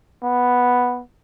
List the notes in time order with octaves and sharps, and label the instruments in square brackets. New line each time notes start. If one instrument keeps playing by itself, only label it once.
[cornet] B3